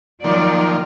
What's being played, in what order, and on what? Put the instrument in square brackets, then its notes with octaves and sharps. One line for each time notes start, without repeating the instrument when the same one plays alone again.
[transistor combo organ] D#3 F3 A#3 [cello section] F#3 D5